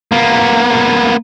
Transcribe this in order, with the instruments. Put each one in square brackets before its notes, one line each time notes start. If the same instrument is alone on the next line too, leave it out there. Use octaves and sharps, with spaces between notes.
[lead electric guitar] A#3 B3